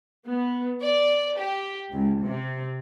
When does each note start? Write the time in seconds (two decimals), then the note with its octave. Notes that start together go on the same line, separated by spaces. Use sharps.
0.25 B3
0.82 D5
1.35 G4
1.92 C#2
2.21 C3